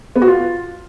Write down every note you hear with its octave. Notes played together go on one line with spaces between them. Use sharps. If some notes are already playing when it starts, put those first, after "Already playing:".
B3
F#4
F4